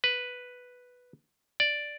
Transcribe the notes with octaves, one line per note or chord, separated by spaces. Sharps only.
B4
D5